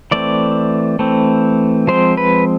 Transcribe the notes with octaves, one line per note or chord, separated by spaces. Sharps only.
E3 A3 C4 D5
E3 A3 C4
F3 G#3 C4 C5
B4